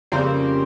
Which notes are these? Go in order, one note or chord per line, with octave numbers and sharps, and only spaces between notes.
F2 C#3 G3 A#3 C4 C5